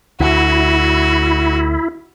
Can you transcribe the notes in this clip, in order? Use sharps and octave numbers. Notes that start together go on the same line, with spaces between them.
D2 E4 F#4